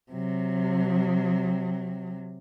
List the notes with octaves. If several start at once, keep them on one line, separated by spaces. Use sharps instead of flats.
C3 F#3